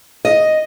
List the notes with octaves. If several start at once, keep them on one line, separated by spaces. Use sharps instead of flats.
D#5